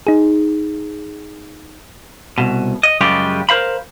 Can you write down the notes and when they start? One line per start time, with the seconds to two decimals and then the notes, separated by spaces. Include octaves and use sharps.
0.07 D#4 G#4
2.38 C2 B2
2.83 D#5
3.01 F#2 C#3 G3 G#3 F4 G4
3.49 A#4 C5 F5 B5